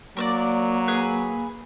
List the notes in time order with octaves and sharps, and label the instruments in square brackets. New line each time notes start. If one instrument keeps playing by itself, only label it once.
[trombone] F#3 [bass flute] A#3 [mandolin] A#4 C#5 D5
[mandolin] G#4 B4